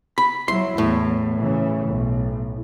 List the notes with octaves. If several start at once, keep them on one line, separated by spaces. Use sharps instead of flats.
B5
F#3 E4 C6
E2 A2
C#3 E3
B1